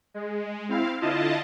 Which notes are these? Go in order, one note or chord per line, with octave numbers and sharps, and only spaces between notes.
G#3
C4 E4 F5
D3 E4 F4 D#5 A5